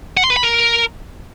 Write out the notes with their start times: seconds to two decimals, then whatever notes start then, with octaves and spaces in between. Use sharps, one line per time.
0.17 F#5
0.24 C6
0.30 B4
0.37 B5
0.43 A#4